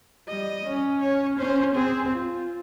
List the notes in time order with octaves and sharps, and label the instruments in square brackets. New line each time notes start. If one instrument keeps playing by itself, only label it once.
[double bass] G3 [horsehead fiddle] D#5
[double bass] C#4
[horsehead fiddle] C#5
[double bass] C#4 [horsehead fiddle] C5
[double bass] C4 [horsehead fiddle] G#4
[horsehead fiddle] F4